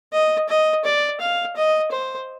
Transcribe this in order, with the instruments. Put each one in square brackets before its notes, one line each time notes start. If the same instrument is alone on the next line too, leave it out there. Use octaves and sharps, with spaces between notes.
[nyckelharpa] D#5
D#5
D5
F5
D#5
C5